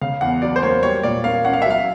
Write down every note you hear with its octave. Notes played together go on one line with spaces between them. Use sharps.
C#3 F5
E2 F#5
F#3 D5
C5
A#3 C#5
G3 C#5
A#2 D5
A#3 F5
C#4 F#5
F5
E5
F#3 F5